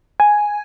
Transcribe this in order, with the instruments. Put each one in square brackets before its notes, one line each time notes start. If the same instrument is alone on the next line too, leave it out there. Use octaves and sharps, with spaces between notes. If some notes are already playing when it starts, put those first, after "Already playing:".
[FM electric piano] G#5